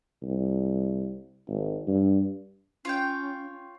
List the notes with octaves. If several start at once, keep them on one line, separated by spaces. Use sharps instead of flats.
C2
G#1
G2
C#4 F4 C#5 G5